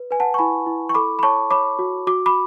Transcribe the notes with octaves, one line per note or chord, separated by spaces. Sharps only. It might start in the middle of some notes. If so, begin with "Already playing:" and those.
Already playing: B4
B4 G#5
F#5 A5
C#6
E4 G#5 B5
E4
C#6
A4 B5 D6
B5
C#5 A5 C#6
C#5 B5 D6
F#4
F#4 D6
B5 D6